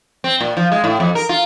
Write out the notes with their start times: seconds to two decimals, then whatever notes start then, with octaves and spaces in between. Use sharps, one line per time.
0.24 C4
0.41 A#2
0.57 F3
0.72 G#3
0.84 A2
1.00 F2
1.15 A#4
1.29 F4